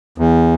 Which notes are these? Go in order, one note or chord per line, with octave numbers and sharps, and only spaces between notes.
E2